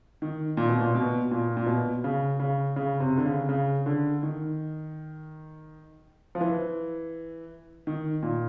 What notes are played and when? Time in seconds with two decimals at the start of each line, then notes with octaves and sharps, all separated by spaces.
0.22 D#3
0.57 A#2
0.69 B2
0.81 A#2
0.95 B2
1.31 A#2
1.57 A#2
1.66 B2
2.04 C#3
2.40 C#3
2.76 C#3
3.00 C3
3.17 D3
3.26 C#3
3.49 C#3
3.86 D3
4.23 D#3
6.35 F3
6.41 E3
7.87 D#3
8.22 A#2